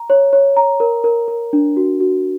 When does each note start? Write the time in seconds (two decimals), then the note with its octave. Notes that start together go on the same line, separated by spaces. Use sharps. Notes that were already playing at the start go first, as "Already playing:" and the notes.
Already playing: A#5
0.10 C#5
0.33 C#5
0.57 A#5
0.80 A#4
1.04 A#4
1.28 A#4
1.53 D4
1.77 F#4
2.00 F#4